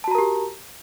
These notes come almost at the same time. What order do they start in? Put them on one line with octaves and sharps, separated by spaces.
A5 F#4 A#5 A#4 G4